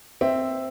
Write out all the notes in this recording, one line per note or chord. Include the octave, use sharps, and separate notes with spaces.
C4 E5